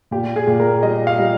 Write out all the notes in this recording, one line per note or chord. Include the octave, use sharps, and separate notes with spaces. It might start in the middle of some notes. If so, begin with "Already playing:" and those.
A#2 G4
G#4
A#2
A#4
G3 D#5
F5
G3